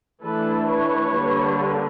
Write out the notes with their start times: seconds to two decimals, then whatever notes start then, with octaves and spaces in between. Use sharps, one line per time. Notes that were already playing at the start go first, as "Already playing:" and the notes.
0.23 E3 A3 D4 A4 B4
0.69 B4 C#5
1.14 D3 G3 A#3 D4